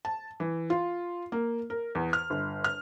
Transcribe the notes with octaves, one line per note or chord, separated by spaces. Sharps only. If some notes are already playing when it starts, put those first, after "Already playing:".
A5
E3
F4
A#3
A#4
E2
F6
G1
F6